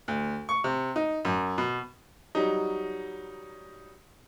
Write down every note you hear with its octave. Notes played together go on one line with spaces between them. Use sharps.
D2
C#6
C3
D#4
F#2
B2
F#3 G3 D#4